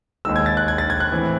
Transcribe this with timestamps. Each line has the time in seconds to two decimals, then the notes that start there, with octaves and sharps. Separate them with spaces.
0.25 D#2 D#3 G#3 E6
0.36 G#6
0.46 A6
0.57 F#6
0.68 G#6
0.78 A6
0.90 G#6
1.00 F#6
1.11 A2 E3 C4